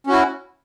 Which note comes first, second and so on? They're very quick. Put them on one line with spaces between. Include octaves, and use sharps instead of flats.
C#4 F#4 E4